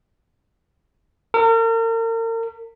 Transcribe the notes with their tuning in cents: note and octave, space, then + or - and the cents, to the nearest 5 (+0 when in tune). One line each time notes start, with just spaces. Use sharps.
A#4 -40